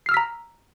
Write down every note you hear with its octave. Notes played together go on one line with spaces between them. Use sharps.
A#5 E6 F6 B6 C7